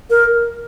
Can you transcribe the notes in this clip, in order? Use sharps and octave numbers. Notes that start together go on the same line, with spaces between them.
A#4